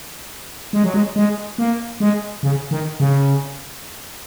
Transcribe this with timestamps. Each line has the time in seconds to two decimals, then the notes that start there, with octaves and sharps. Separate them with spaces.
0.73 G#3
0.84 F#3
0.94 G#3
1.16 G#3
1.58 A#3
2.00 G#3
2.43 C#3
2.71 D#3
3.00 C#3